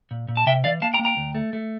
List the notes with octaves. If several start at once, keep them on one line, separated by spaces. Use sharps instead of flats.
A#2
A#2
A5
C3 E5 G5
E3 D5 F5
A#3 F5 A5
G5 A#5
A#3
G5 A#5
D2
A3
A3